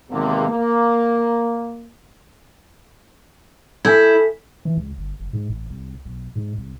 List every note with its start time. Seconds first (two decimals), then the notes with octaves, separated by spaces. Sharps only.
0.11 G#1 E2 C3 A#3
0.48 A#3
3.85 E4 A4 G#5 G6 G#6 B6
4.65 E3
4.77 C#2
4.98 G1
5.20 F#1
5.33 G#2
5.50 A1
5.70 C2
6.05 B1
6.36 G#2
6.58 C2